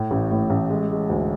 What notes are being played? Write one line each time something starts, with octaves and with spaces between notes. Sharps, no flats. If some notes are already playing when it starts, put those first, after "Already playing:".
Already playing: A2
A1
A2
A1
G#3
G#3
D2